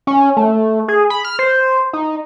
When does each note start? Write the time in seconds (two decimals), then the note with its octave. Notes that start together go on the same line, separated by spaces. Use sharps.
0.07 C#4
0.37 A3
0.88 G#4
1.10 B5
1.25 F6
1.39 C5
1.93 D#4